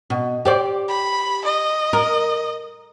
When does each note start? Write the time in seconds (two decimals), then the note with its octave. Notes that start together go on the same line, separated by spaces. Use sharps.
0.10 B2
0.45 G4 C5 D5
0.88 B5
1.45 D#5
1.93 A#4